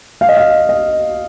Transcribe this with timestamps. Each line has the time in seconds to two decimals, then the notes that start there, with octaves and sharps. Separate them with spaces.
0.21 F5
0.29 D#5
0.37 F5
0.69 D#5